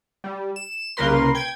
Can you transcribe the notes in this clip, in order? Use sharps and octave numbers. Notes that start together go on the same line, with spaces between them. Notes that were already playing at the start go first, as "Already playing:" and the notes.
G3
E7
C2 C#3 A#3 A#4 B4 C6
G5 G#6